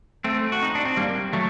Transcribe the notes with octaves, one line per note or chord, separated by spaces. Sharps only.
A3 C4
F#4
D#4
D4
C4
G3 A#3
F#3 A3